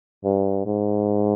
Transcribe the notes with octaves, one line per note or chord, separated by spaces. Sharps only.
G2
G#2